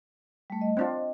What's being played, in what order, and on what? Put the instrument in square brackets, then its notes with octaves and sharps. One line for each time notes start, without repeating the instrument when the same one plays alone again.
[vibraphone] G3 A3
D#5
[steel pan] C4 D4 F4